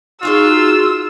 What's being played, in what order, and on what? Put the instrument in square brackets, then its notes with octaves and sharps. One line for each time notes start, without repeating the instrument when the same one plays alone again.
[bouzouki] G#3 F#4 F5 [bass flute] D#4 [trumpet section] F4 [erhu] E6